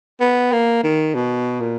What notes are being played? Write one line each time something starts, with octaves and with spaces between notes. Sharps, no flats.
B3
A#3
D#3
B2
A#2